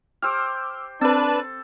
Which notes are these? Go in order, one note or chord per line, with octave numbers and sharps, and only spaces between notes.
G4 C5 D6 E6 F6
C4 D4 A4 B4 A5